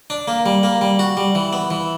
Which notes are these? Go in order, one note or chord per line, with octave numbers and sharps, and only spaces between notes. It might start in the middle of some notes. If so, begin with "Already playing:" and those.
D4
A#3
G3
A#3
G3
F#4
G3
E3
B3
E3